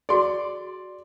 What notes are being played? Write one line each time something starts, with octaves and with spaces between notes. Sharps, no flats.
F#4 G#4 D5 C6